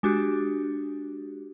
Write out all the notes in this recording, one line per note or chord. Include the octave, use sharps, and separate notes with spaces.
G#3 D4 F#4 G4